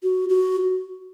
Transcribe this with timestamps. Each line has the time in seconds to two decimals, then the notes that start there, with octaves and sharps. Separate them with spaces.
0.03 F#4
0.29 F#4